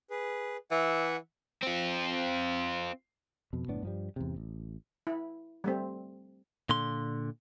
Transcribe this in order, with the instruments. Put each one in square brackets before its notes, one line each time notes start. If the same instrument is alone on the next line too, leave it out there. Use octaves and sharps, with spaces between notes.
[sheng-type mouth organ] G#4 B4
[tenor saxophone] E3 [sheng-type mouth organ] E5 F#5
[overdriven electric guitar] C4 F4
[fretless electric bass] F2 B2
F#1 A2 B3 D4
G2 F3 G3
E2 G#2 C3
A1
[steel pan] E4
G3 A3 C4
[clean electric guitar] A#2 D3 C6